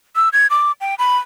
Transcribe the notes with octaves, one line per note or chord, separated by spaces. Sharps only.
E6
G#6
D6
G5
B5